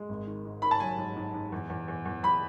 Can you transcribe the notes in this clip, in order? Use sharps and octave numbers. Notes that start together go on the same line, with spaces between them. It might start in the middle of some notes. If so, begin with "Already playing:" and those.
Already playing: G#3
G#1
D#3
G#2
D#3 B5
A5
F#3 G#5
G#2
G#2
G#2
E2
E2
E2
E2
E2 B5